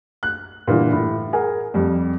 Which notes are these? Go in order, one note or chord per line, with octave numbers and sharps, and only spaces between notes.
F#6
A#2 D3 E3 G3
A2
G#4 A#4 F#5 G#5
F2 G3